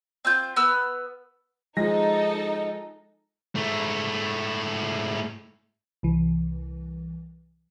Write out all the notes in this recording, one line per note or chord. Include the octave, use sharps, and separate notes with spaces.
C4 F4 G6
B3 B4 E6 F6
F3 G#3 D#4 A4 D#5 A#6
G#2 A3
C2 E3